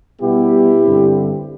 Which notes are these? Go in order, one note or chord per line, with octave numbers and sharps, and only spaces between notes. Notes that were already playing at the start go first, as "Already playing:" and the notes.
B2 G3 B3 E4 G4
G2 D3 G3 C4